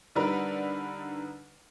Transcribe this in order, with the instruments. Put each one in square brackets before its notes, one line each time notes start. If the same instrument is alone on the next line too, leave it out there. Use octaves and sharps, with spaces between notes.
[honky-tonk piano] D3 G3 D4 D#4 A#4 B4